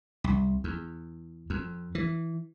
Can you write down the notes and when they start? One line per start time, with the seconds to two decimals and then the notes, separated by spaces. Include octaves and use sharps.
0.24 C2
0.64 E2
1.50 F2
1.95 E3